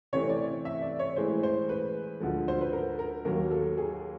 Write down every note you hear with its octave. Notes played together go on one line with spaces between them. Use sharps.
C3 E3 A3 C4 C#5
D5
E5
D5
C#5
A2 E3 G#3 C5
C5
B4
D2 D3 F3 G#3
C5
B4
A#4
A#4
D#2 D#3 F#3 A#3 A#4
A4
G#4